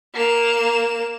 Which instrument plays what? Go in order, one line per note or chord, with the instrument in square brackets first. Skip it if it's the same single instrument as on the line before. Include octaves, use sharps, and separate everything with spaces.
[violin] A#3 E7